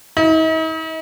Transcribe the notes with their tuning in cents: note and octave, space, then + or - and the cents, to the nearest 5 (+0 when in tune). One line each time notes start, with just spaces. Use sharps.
D#4 +45